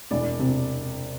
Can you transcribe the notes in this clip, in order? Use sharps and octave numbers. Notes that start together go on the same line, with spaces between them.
E1 D5
C3